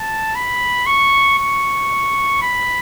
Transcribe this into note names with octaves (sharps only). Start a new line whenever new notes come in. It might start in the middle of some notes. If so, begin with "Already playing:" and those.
Already playing: A5
B5
C#6
C#6
B5